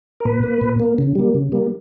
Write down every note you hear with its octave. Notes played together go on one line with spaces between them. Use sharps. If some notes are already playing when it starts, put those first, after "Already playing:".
A#4
A#2 B4
A#3
A#2
A#3
C#3
G3 A#3
C#3
G3 A#3